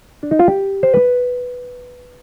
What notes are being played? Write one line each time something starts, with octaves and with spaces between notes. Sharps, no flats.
D4
D#4
F4
G4
C5
B4